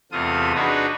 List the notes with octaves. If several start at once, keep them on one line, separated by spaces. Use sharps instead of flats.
E2 C3 A3 F4 D#6
D4 D#4 F#4 G#4 B4